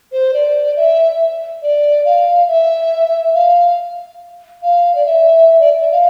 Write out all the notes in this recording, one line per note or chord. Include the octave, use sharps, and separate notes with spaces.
C5
D5
E5
D5
F5
E5
F5
F5
D5
E5
E5
D5
E5
F5